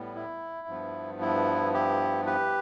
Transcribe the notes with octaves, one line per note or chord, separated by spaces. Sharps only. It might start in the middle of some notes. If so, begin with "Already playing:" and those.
Already playing: A2 G3 B3
E4
G2 F3 B3
E4
E4 G4
G4 B4